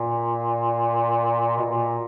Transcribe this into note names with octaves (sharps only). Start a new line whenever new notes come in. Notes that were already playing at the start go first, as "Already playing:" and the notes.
Already playing: A#2
B2
A#2